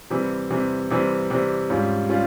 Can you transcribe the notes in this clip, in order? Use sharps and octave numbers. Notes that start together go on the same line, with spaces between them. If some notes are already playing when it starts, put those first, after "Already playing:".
C3 E3 G3 C4
C3 E3 G3 C4
C3 E3 G3 C4
C3 E3 G3 C4
G#2 G3 C#4 F4
G3 C#4 F4